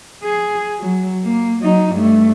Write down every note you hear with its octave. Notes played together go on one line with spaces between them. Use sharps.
G#4
F#3
A#3
F#3 D#4
G2 A3